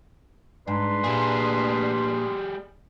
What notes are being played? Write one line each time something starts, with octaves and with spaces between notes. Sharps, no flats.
G#2 D4 B4 C6
A#2 G3 A#3 G#4